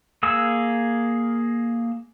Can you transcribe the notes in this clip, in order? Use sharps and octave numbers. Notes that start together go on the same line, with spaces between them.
A#3 G#4 E6